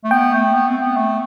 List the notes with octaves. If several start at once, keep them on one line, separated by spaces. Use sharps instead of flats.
A3
B3 G5
A3
B3
C4
B3
A3